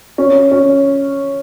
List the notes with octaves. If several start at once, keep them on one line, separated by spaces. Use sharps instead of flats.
C#4
C#4